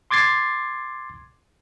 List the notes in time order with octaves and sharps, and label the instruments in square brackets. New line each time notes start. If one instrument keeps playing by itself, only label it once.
[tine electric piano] C6 D6 G#6 A6 C7